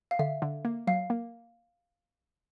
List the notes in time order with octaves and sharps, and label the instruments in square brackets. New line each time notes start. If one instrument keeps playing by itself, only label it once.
[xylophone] F5
[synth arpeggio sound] D3 [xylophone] E5
[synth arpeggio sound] D3
A#3
[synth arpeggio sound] F#3 [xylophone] F5
[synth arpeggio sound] A#3